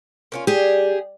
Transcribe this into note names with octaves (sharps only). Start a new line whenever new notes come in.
A#3 C#4 F4
G3 G4 G#4